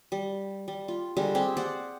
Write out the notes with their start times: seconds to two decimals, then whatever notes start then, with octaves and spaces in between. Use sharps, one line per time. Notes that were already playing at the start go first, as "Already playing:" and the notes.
0.12 G3
0.68 G3
0.88 F4
1.17 D3 G3 G#3
1.35 C4 G4 G#4
1.57 C5 D5 F#5